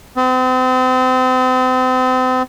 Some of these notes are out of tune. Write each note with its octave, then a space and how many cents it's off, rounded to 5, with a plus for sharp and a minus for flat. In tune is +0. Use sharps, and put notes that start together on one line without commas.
C4 -35